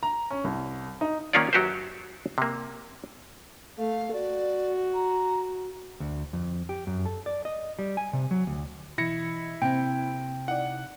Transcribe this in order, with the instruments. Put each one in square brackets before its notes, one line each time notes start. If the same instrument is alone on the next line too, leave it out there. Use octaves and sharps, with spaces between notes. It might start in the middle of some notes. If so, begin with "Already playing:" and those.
[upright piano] A#5
C#4
C2
D#4
[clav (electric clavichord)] D#3 A#3 C#4 F4 C#5 D5
F#2 F#3 F#4 G4 B4 C5
C3 A#3
[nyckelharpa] A3 [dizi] F5
[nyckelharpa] F#4 [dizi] D5
[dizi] A#5
[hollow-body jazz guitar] D2
F2
G4
F#2
A4
D5
D#5
G3
G#5
C3
F#3
D2
[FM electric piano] B2 E3 D#5 [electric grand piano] E4 A#6 C#7
[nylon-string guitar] C3 [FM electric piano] A#3 C4 [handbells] G5
[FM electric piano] D#4 E4 D5 [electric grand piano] F#5